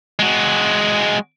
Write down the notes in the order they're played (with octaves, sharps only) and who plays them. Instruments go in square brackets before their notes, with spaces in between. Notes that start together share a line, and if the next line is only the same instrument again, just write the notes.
[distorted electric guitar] G#3 F#4